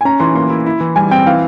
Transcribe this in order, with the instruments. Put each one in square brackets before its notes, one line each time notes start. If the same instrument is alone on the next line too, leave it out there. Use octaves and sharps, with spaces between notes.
[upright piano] G#5
[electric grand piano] C#4 [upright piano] A#5
[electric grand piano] E3 [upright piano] C6
[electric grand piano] A#3 [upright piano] C6
[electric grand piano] E4
E4
E3
[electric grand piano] G3 [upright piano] G#5
[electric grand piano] C4 [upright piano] G5
[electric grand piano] E3 [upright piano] F5